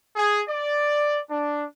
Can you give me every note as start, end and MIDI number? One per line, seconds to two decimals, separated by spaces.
0.16 0.41 68
0.49 1.18 74
1.30 1.65 62